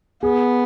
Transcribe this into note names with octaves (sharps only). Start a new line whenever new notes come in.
B3 G#4